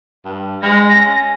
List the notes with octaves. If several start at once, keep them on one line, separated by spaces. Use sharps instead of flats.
G2
G#3 A#6
C#4